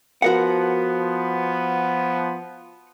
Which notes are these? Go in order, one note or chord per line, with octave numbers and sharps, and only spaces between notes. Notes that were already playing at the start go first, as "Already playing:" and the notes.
F3 B3 F#4 A#4 F#5